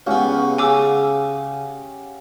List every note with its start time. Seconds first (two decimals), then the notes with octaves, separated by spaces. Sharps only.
0.07 C#2 B3 C#4 G4 F#5
0.58 C#3 G#5 D6 E6